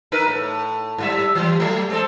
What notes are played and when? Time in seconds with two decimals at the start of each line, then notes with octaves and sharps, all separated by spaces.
0.12 D#4 A#4 B4
0.28 A2
0.98 G#2 G3 E5
1.35 E3 G3
1.60 F#3 A3
1.90 G#3 C4 A4